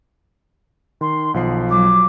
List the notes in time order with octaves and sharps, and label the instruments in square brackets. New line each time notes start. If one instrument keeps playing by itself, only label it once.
[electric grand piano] D#3 [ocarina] C6
[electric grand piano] B1 F3 C7 [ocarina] F#5
[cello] F#3 [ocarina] D6